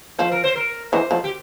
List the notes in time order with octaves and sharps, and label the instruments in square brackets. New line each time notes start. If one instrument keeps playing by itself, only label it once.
[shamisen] F3 [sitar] C5
[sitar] A#4
C5
A#4
[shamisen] E3 [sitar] C5
[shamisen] F3
[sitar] G4